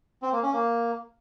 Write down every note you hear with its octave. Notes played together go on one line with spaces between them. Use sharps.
C4
A#3
C#4
A#3